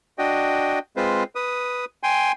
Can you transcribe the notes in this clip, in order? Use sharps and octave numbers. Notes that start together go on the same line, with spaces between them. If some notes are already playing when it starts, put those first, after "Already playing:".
D4 F#4 D#5 G5
G#3 C4 F4 B4 C5
B4 D#6
G5 G#5 C6